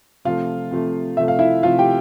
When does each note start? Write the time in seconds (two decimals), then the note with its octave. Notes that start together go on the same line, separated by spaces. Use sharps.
0.25 C3 F3 A3 F4 F5
0.71 C3 F3 A3
1.17 C3 F3 A3 E5
1.28 F5
1.39 E4 E5
1.63 C3 F3 A3 F4 F5
1.79 G4 G5